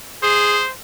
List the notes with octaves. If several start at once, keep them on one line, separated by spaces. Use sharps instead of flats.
G#4 C5